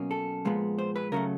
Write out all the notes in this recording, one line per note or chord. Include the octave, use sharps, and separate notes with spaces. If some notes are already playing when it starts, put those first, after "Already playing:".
Already playing: B2 F#3 A#3 C#4
A4
A#2 F3 G#3 B3
C5
B4
C#3 F#3 A3 A#4